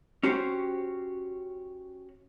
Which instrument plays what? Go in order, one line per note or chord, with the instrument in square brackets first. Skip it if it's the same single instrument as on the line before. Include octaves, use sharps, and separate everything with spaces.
[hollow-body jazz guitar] C#4 F#4 G4 C5